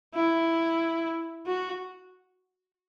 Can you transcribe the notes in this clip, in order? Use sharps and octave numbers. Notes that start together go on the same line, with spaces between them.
E4
F#4